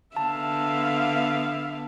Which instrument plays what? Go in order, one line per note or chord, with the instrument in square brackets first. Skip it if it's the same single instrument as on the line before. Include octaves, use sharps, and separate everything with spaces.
[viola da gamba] D3 B3 [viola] E5 F5 [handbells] A5